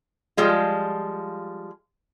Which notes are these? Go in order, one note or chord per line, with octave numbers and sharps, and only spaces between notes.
F3 G3 G#3 F4